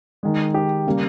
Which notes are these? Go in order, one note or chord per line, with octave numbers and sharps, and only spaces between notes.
D#3 G#3
G4
C#3 G3 A#3